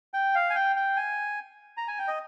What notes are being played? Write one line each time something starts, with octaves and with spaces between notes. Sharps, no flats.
G5
F5
G#5
G5
G5
G#5
A#5
G#5
G5
D#5